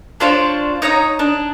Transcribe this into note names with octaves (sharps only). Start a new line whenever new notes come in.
D4 F4 C5 C#5
D#4 C#5 A#5 D#6
D4